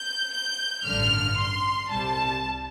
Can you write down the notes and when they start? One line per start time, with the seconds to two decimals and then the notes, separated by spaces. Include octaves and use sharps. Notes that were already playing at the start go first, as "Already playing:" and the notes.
Already playing: G6
0.33 G6
0.86 A1 G2 D3 F6
1.38 C6
1.90 C2 C3 G3 A5